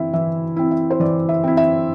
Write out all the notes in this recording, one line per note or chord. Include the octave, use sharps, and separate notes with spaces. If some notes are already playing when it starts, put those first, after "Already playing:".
Already playing: E3 C4 E4 E5
E3 E5
C4 E4
E5
C5
E3 D5
E5
C4 E4
E5